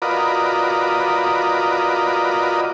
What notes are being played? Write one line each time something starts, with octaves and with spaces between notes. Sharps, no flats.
F4 F#4 A#4 B4 D5 D#5